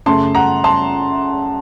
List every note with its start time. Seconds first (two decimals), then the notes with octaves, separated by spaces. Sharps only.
0.06 F#2 C#3 A3 A5 C6
0.35 F#5 A#5
0.64 A5 C6